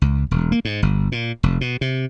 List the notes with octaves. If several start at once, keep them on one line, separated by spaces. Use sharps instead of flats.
C#2
E1
A#3
G#2
G1
A#2
F1
B2
C3